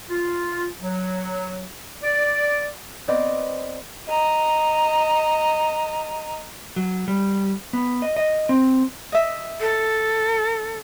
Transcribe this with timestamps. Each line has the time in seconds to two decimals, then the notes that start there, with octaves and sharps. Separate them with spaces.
0.10 F4
0.80 F#3
2.03 D5
3.08 B3 C4 D5 D#5
4.07 D#5 A#5
6.76 F#3
7.08 G3
7.73 B3
8.02 D#5
8.17 D#5
8.49 C4
9.12 D#5 E5
9.60 A4